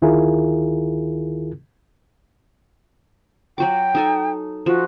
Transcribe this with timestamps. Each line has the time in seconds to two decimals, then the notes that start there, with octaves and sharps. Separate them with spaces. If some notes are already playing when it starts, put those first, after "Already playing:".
0.02 D2 D#3 E4 F4 G#4 A#4
3.58 F#3 F#4 G5 D6
3.95 D#4 A4 G#5
4.66 F3 F#4